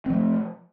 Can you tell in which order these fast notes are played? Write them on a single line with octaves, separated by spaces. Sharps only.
C4 F3 A3